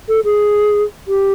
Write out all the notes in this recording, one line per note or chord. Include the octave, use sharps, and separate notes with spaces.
A4
G#4
G4